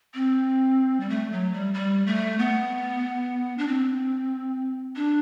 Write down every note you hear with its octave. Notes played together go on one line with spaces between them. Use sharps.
C4
G3
A3
F#3
G3
G3
A3
B3
D4
C4
D4